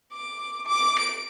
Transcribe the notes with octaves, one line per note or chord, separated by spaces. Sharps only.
D6
D6
D7